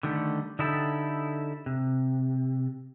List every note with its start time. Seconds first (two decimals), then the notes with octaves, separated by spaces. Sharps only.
0.03 D3 D#3 G3 A3
0.59 D3 D#4 E4 G4 A4
1.66 C3